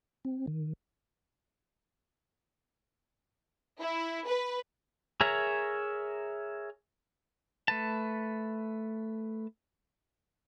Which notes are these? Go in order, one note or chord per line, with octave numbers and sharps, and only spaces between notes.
C4
D#3
E4
B4
G#4 A#4 C#5 E5 A#5
A3 B4 A5